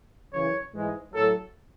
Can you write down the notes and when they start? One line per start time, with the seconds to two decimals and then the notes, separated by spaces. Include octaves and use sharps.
0.32 F#2 C#3 E3 C#5
0.72 G#2 E3 G#3
1.13 A2 F#3 A4